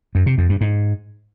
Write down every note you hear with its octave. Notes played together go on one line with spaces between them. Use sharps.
F#2
C3
F2
G2
G#2